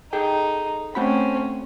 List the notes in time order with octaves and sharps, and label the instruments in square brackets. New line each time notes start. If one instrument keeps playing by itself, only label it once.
[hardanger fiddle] D#4 [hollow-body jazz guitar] G#4 A4 G5
[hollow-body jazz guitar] A3 F#4 B5 [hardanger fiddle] C4 C#4